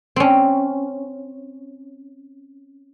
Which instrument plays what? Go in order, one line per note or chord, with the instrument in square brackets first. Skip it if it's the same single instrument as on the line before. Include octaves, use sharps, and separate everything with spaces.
[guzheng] C4 C#4